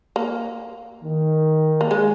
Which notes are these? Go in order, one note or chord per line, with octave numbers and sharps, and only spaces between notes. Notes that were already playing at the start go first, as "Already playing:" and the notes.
A#3
D#3
A#3
G#3